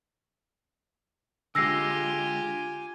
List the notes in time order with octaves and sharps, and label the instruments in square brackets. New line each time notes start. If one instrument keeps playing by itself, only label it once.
[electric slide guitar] D3 G#3 [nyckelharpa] F4 G4 [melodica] G#5 [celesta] E6 A#6 C7